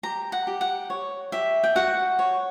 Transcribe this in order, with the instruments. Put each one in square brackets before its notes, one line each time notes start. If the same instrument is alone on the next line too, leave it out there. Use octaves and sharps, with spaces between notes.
[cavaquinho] G4 A#5
F#5
G4
F#5
C#5
G4 E5
G5
F#4 F#5
C#5